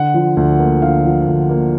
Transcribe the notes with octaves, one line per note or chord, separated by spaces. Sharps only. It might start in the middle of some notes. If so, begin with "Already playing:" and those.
Already playing: D3 F#5
F3
D2
A#3
D3 F5
F3
D2
A#3